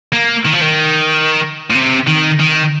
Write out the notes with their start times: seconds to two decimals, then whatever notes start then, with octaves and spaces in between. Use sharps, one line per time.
0.13 A#3
0.46 D#3
0.53 F3
0.62 D#3
1.70 A#2
1.74 C3
2.07 D#3
2.40 D#3